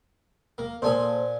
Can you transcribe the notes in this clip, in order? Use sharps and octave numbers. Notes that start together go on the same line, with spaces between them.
A#3
A#2 A#3 A4 C5 G#5 D#6